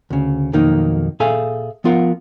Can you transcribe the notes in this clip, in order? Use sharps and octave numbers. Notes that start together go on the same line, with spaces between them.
D2 C#3
B1 F2 D#3 F#3 A#3 D#4
A#2 G#4 A4 E5 F5 G#5
F3 B3 F4 A#4 F5 F#5